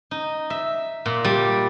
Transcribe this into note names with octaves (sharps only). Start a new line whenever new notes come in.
D#4
E5
A#2
G3